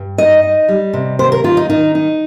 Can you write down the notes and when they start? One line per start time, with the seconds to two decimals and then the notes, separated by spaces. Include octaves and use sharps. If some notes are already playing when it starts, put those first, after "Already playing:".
Already playing: G2
0.18 D#4 D#5
0.43 D#4
0.69 G3
0.93 C3
1.19 D#2 C5
1.32 A#4
1.44 D#3 F4
1.57 D#4
1.70 D#3 D#4
1.95 D#4